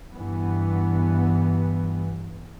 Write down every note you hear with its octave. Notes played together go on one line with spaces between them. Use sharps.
G2 E3 B3